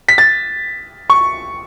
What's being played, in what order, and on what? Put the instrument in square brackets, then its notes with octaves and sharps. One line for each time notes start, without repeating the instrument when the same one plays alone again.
[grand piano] B6
A6
C#6